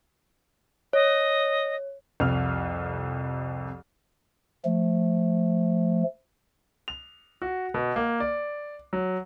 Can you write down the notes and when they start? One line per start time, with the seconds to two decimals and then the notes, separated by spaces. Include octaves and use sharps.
0.93 C#5 D#5
2.20 C2 F2 F6 F7
4.65 F3 A3
6.88 F7
7.42 F#4
7.74 B2
7.96 A#3
8.20 D5
8.93 F#3